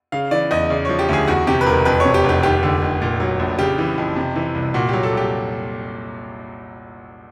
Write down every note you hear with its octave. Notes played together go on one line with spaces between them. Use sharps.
C#3 F5
E3 D5
E2 D#5
C#3 D5
F3 C#5
G4
D2 G#4
E2 F#4
C3 G4
B4
E1 A#4
F2 B4
C3 C#5
G4
F1
G4
D#2 G4
D3
F1
A#2
F#3
A#1
C#3 G4
E3
F2
C3
E3
C2
A#2 F#4
F#3 G4
A4
C2 G4